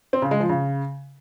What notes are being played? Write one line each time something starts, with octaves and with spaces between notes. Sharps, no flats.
C4
C#3
G#3
F3
C#3